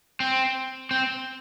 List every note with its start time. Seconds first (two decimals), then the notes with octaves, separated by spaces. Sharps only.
0.20 C4
0.91 C4